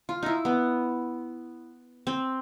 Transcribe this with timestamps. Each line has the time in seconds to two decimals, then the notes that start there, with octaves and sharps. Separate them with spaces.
0.09 F4
0.23 D#4 E4
0.45 B3
2.07 C4